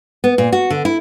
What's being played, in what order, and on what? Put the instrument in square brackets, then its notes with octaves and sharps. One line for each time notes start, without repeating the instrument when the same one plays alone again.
[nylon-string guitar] B3
A#2
F#4
D3
E4